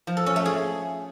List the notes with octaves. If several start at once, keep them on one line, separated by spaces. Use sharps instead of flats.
F3
A4
C#4
A3
G#4